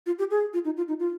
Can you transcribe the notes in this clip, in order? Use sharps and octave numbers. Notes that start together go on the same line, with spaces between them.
F4
G4
G#4
F4
D#4
F4
D#4
F4